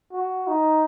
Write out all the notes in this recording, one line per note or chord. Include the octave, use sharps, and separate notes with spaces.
F#4
D#4